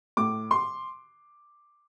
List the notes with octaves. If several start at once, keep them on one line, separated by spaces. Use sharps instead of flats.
A2 D6
C6